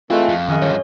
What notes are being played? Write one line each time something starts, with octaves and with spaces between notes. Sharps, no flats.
E3 G#3 A3 C4 F4 F5
F2
F#2 D#3 G#4 D#5
G2 F3 C#5